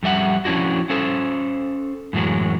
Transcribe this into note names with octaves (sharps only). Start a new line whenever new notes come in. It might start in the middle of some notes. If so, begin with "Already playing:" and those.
F2 G3 E5 F#5
F3 C#4 D4 E4 F#4
C#4 A4 C5
F#2 A2 E3 F#3 G#3